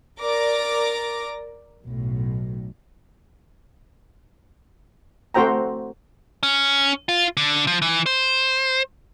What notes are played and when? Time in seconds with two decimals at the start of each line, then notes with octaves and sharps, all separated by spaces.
0.20 A#4 D5 D6 A#6
1.83 B1 A2
5.34 A3 C4 F#4 C5 G5 A#5
6.43 C#4
7.09 F4
7.37 D3
7.67 F3
7.82 E3
8.06 C5